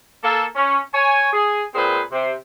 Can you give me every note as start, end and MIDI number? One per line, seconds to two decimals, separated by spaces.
0.24 0.45 58
0.24 0.45 69
0.55 0.80 61
0.94 1.31 73
0.94 1.31 80
1.33 1.63 68
1.74 2.01 46
1.74 2.01 60
1.74 2.01 68
1.74 2.01 71
1.74 2.01 72
2.12 2.34 48
2.12 2.34 72